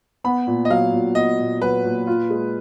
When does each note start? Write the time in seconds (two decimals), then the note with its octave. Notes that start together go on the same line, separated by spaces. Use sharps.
0.24 B3 B5
0.47 A#2
0.65 D#5
0.70 F#3 F5
0.93 A#2
1.15 B3 D#5
1.38 A#2
1.62 F#3 B4
1.84 A#2
2.07 F4
2.30 G#3